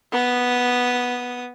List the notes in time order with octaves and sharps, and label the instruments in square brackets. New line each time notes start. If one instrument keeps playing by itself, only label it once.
[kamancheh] B3 D#6